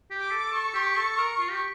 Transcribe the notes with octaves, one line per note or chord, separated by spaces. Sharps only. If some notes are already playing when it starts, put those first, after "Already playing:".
G4
D6
A4
A4 C#6
G4
A4
A#4
F4
G4